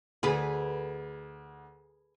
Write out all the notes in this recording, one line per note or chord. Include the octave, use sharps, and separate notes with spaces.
D2 G#4 A4 B4